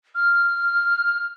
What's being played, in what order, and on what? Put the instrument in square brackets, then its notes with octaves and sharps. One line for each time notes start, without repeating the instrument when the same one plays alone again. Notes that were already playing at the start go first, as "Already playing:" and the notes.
[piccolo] F6